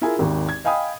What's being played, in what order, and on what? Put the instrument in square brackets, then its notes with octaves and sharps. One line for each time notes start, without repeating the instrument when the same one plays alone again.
[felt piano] E4 F4 G#4 A#4 G#5
G#1 D#2
G#6
D#5 F5 G5 G#5 B5 D#6